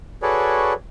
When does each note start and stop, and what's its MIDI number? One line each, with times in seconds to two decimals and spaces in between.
0.22 0.73 66
0.22 0.73 68
0.22 0.73 69
0.22 0.73 71
0.22 0.73 73
0.22 0.73 74